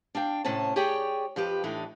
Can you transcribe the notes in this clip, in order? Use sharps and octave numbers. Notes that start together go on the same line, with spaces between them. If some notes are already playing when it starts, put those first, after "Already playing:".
D4 F5 G5
A2 C3 C#4 C#5 A5
G4 G#4 C#5 D5 G5
F2 F3 G4 B4
A2 E3 D4 D#4 A4